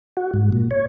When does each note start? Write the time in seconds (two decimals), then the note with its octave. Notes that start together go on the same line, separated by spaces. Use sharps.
0.17 F#4
0.34 G#2
0.52 A#2
0.71 C#5